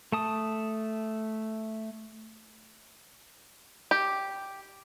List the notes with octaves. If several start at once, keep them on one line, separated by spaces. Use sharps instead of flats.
A3 A5 D#6
G4